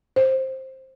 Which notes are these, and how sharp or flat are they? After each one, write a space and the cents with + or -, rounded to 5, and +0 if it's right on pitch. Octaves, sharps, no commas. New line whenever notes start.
C5 +15